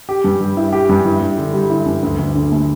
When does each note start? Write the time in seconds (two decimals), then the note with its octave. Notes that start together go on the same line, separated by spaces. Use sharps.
0.09 G4
0.24 G2
0.41 G3
0.57 E4
0.73 G4
0.89 G2
1.05 E4
1.22 G2
1.38 D3
1.54 G3
1.70 E4
1.86 G2
2.03 D2
2.19 D2
2.35 D3
2.52 A3